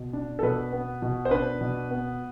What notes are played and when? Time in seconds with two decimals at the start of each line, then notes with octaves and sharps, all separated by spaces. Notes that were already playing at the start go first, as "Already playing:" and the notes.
Already playing: B2
0.13 D4
0.39 A4
0.43 B2 B4
0.73 B3
1.02 B2
1.25 C5
1.31 D4 B4
1.61 B2
1.91 B3